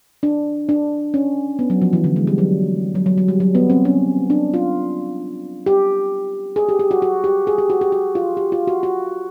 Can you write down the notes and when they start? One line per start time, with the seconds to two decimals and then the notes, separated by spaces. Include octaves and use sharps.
0.23 D4
0.69 D4
1.14 C#4
1.59 B3
1.70 F#3
1.82 F3
1.93 E3
2.04 D3
2.16 G#3
2.27 G3
2.38 F#3
2.95 F#3
3.06 F#3
3.18 F#3
3.28 G3
3.40 F#3
3.55 B3
3.70 C4
3.85 C#4
4.30 D4
4.54 F4
5.66 G4
6.56 G#4
6.69 G4
6.79 G4
6.91 F#4
7.02 F#4
7.24 G4
7.47 G#4
7.58 G4
7.70 F#4
7.81 G4
7.92 F#4
8.15 F4
8.37 G4
8.52 F4
8.67 F#4
8.83 F#4